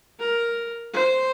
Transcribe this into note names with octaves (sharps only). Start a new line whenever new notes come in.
A#4
C5